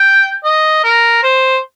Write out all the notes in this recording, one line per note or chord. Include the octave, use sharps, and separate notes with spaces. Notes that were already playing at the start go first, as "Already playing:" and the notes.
Already playing: G5
D#5
A#4
C5